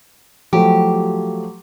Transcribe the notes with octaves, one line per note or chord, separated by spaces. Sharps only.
F3 F#3 A3 G4